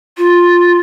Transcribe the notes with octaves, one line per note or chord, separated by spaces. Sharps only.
F4